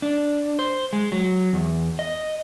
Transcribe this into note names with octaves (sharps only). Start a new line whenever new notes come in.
D4
C5
G#3
F#3
E2
D#5